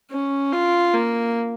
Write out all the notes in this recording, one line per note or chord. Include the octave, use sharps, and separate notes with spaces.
C#4
F4
A#3